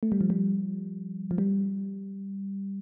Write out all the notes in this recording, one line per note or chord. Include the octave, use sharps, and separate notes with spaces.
A3
G3
F3
G3
F3
G3